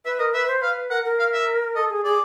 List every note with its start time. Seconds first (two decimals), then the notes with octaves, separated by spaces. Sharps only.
0.05 B4 E5
0.19 A#4 D#5
0.34 B4 E5
0.48 C5
0.61 B4 F5
0.90 A#4 F#5
1.05 A#4
1.19 F5
1.33 E5
1.75 A4 D#5
1.90 G#4
2.04 G#4 D5